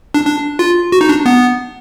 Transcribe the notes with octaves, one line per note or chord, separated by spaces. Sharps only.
D4
D4
F4
F#4
D#4
D4
B3